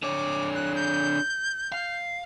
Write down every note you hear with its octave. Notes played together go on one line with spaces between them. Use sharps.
D3 C#5 D6
F#6
G6
F5